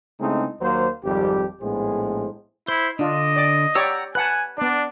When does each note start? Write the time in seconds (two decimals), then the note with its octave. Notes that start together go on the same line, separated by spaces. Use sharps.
0.20 C#3 G#3 A3 C4 D#4 E4
0.61 D#2 F#3 A#3 C5
1.04 G#1 F2 G3 G4
1.61 A#1 A2 G#3 B3 G#4 C5
2.68 E4 C5
2.99 D3 D4 F4 D#5
3.36 D5
3.75 G4 C#5 D5 F#5 A#5 E6
4.15 B4 F#5 G#5 A5 F#6
4.58 B3 D4 D5